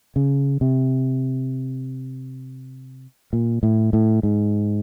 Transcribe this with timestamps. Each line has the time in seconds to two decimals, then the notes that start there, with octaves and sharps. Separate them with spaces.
0.16 C#3
0.61 C3
3.33 A#2
3.63 A2
3.93 A2
4.23 G#2